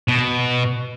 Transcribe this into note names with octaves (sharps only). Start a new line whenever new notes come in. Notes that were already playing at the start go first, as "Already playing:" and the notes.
B2